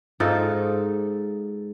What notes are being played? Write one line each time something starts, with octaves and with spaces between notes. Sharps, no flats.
G#2 D#4 F4 A4